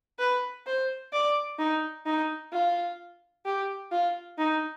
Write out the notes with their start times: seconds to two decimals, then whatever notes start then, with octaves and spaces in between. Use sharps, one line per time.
0.19 B4
0.66 C5
1.13 D5
1.59 D#4
2.06 D#4
2.52 F4
3.45 G4
3.91 F4
4.38 D#4